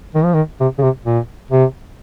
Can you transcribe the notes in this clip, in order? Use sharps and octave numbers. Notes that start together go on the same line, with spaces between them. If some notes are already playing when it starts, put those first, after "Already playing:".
D#3
F3
D#3
C3
C#3
C3
A#2
C3